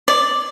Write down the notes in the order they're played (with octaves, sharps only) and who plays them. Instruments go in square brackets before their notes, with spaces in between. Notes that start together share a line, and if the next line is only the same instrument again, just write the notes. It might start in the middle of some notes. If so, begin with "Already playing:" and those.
[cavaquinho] D5